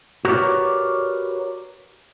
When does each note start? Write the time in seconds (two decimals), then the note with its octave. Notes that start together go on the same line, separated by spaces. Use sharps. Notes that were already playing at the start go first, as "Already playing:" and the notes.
0.25 F#4 G4 A#4 B4 C#5 D5